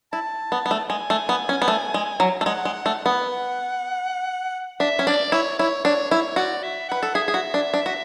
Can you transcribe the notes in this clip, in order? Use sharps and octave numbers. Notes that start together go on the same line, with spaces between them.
E4 A5
B3
B3
A3
G#3 G#5
A3
B3
C#4
B3
A3
G#3
F#3
A3
G#3 F#5
G#3
F#5
A3
F#5
B3
D4 E5
C#4
D4 D5
E4 C#5
E4 C#5
D4 C#5
E4 C#5
F#4 D5
E5
B4 F#5
A4
G#4 E5
G#4
F#4
D4
D4
F#4